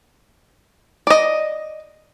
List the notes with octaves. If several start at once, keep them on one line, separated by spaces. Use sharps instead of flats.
D5 D#5